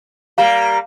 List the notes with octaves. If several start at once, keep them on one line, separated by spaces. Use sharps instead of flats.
G3 A#3 F5 A#5